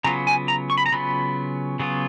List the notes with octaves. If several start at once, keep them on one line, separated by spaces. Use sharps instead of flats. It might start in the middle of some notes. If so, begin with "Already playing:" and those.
C#3 F#3 B3 F4 A#5
G#5
A#5
C#6
B5
A#5
C#3 F#3 B3 F4 B5
C#3 F#3 B3 F4